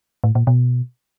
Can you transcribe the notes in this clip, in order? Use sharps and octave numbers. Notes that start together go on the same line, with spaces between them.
A2
A#2
B2